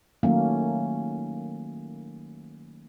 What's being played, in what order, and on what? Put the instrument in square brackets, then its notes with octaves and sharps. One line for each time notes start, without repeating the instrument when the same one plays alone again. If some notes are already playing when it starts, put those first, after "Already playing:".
[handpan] D#3 F#3 A3 A#3 C#4